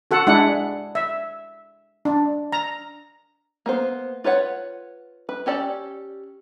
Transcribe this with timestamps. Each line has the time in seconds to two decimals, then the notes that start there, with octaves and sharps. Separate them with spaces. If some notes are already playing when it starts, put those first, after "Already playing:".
0.11 F#4 A4 F#5
0.27 G#3 D4 E4 F#5
0.95 E5
2.05 D4
2.52 A#5
3.66 A#3 B3 C5
4.24 F4 B4 C#5 F#5
5.29 B4
5.46 C#4 G4 A4 D5